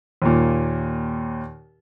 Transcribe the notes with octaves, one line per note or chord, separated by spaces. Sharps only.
D#2 A#2